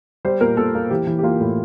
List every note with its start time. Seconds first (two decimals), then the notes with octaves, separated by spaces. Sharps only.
0.25 G3 C5
0.41 A#2 A#4
0.57 A#2 A4
0.75 A#3
0.90 E3 G4
1.07 E3
1.19 G4
1.23 A#3 F4
1.41 A2